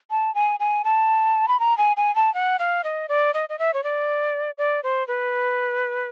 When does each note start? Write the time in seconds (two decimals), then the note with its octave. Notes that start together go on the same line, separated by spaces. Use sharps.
0.11 A5
0.35 G#5
0.60 G#5
0.84 A5
1.48 B5
1.60 A#5
1.78 G#5
1.97 G#5
2.16 A5
2.34 F#5
2.59 F5
2.84 D#5
3.09 D5
3.34 D#5
3.49 D#5
3.59 E5
3.74 C#5
3.84 D5
4.58 D5
4.83 C5
5.08 B4